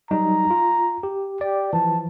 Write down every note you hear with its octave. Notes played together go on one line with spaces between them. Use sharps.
F#3 G3 D#4 A#5
F4
G4
G4 D5
E3 F3 A5